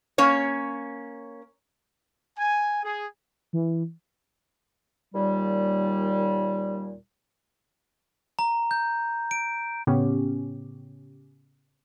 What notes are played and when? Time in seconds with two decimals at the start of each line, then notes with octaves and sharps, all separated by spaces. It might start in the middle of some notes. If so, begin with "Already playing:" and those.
0.18 A#3 C#4 C#5
2.39 G#5
2.83 G#4
3.53 E3
5.14 D#2 A#2 G3
8.39 A#5
8.71 G6
9.31 D7
9.87 A2 C#3 B3 C#4 G4